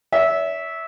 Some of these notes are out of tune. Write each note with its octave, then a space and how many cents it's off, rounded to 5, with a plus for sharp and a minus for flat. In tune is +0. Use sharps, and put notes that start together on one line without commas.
C#5 +40 E5 -10